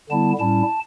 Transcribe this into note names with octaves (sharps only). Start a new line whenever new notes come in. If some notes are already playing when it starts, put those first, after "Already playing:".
D3 G3 B3 E4 A5
A2 G3 C#4 E4 A5